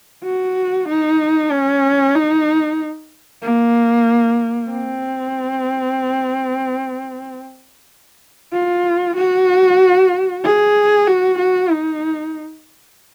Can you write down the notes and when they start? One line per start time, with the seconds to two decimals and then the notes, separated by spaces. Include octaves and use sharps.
0.24 F#4
0.89 D#4
1.52 C#4
2.15 D#4
3.43 A#3
4.70 C4
8.53 F4
9.16 F#4
10.44 G#4
11.07 F#4
11.39 F#4
11.71 D#4